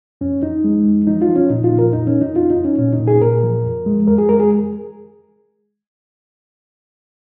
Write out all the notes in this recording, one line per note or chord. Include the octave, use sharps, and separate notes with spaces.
F2 C#4
F2 D#4
G#3
F2
F3 D#4
F4
F3
C#4
A#2 D#4
F4
A#2
A#4
F2 D#4
C#4
F2
D#4
F2 F4
D#4
F2
C#4
A#2 C#4
D#4
A#2
G#4
A#2 A#4
F3
F2
G#3
F2 A#4
G#4
G#3 A#4
G#4